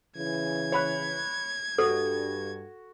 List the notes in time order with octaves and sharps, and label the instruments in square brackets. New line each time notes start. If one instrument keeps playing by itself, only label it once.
[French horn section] C#3 E3 [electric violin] G#6
[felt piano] C#5 B5 F#6
[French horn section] G2 [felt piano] F#4 [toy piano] A4